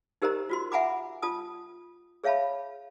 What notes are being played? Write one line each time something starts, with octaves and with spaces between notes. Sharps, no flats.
D#4 G4 A#4 C5 D#5 A#5
F4 F#4 C6
E5 F#5 G#5 A#5 B5 D6
F4 A5 D#6
G#4 C#5 E5 F5 A5 B5